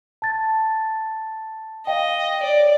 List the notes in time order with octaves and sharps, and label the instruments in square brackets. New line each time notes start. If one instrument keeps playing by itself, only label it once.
[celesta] A5 A6
[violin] D#5 [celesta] F5 G5
[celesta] C#5 [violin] D5